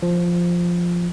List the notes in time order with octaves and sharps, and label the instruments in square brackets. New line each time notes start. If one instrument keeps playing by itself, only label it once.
[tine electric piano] F3